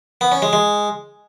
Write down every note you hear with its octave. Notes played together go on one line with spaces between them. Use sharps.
B3
C#4
G#3
G#3